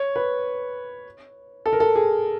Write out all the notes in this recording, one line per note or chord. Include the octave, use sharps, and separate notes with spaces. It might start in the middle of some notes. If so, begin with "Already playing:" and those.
Already playing: C#5
B4
A4
A#4
A4
G#4